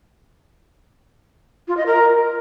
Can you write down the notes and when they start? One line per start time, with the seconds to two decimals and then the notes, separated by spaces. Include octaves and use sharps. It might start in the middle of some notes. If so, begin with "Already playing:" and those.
1.68 F4
1.77 D#5
1.86 A#4